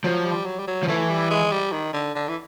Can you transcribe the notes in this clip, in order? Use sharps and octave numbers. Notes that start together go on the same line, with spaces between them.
F3 F#3
G3
F#3
G3
F#3
F3
E3 A3
G3
G#3
G3
D#3
D3
D3
E3